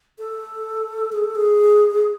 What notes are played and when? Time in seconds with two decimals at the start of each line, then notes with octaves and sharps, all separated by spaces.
0.19 A4
1.12 G#4
1.24 A4
1.35 G#4